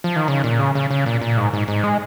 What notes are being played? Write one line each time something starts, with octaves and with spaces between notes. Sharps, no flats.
F3
D#3
C#3
A#2
C#3
C#3
C#3
A#2
A#2
G#2
G#2
G#2
G#3